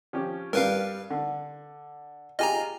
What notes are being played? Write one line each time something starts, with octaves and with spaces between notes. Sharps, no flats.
F3 C#4 G4
G2 G3 A#4 B4 F5
D3
F4 G4 G#4 D#5 G#5 A#5